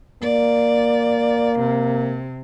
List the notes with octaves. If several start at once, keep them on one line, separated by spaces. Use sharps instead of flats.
A#3 D5
C3